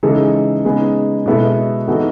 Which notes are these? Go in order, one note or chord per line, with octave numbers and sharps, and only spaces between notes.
C#3 E3 G#3 D#4 A4
C#3 G#3 B3 D#4 G#4
B2 G#3 B3 E4 A4
E3 B3 D#4 F#4 A4